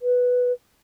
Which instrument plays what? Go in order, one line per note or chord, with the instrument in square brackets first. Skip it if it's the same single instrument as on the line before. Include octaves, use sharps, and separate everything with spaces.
[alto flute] B4